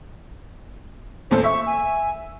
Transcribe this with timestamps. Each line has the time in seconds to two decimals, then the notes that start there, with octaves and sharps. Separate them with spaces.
1.31 E2 A#2 A4 C5
1.44 E5 C#6
1.67 G#5